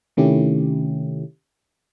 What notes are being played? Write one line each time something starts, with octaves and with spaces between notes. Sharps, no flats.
C3 D#3 A3 C#4 E4 G4